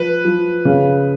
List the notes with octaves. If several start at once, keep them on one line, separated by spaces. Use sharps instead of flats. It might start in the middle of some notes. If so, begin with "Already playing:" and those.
Already playing: F3 B4
F3
C#3